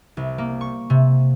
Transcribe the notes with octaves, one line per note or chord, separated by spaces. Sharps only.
C2
A#3
C#6
C3